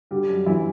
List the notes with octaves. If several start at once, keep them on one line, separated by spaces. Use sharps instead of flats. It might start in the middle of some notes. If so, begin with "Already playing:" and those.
D3 G3 G4
F#2
G1 E3 E4